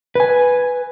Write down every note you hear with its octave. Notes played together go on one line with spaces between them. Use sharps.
B4 G#5